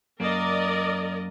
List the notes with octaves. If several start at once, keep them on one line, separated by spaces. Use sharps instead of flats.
F#2 A#3 A#4 D5 D#5